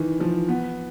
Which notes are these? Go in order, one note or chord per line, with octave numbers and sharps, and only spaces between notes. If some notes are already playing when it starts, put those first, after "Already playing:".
Already playing: D#3 E3
F3
B3